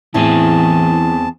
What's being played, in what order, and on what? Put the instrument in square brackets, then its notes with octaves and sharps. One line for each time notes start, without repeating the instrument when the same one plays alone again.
[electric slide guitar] E2 C4 G#4 [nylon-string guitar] A2 E4 [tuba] E3 [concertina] A5